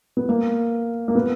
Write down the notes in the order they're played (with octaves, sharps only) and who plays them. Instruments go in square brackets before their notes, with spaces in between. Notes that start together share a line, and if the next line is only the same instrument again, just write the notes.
[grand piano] B3
A#3
A#3
B3